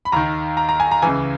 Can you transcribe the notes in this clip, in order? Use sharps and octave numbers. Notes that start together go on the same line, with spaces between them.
B5
D#2 D#3 A#5
A#5
A#5
G#5
A#5
C#2 C#3 E3 G#5